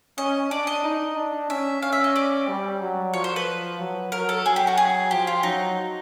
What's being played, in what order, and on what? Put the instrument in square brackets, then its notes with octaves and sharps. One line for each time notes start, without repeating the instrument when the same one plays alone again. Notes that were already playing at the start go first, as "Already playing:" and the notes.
[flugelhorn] C#4 [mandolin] D#5
[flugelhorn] D4 [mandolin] D5
[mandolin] D#5
[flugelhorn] D#4
D4
[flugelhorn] C#4 [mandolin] E5
[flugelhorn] C#4 [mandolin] F5
[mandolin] E5
D#5
D5
[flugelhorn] G3
F#3
[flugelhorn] F3 [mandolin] C#5
[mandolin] C5
B4
[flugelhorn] F#3
[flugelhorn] F#3 [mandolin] A#4
[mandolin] A4
[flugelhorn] F#3 [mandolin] G#4
[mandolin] G4
F#4
G#4
[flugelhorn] F3 [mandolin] G4
[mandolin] F4
[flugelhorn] F#3 [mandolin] D#4